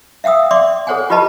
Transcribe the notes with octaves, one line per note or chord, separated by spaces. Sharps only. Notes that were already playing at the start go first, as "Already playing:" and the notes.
E5 F5 G5 D#6 E6
D5 E5 G5 C6 D6
G#4 A4 C5 C#5 F#5 G#5
F4 G4 B4 D#5 A5 B5